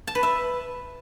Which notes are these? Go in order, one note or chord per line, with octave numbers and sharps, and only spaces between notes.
A5
B4
E5